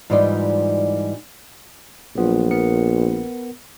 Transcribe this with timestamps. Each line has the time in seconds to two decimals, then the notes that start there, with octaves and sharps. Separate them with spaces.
0.10 G#2 E3 G3 D#4 F4 D5
2.16 A#1 F#3 B3 F4
2.51 B3 A#4 C#7